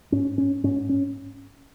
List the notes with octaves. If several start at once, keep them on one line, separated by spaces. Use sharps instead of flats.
G#2 C#4
C#4
G#2 C#4
C#4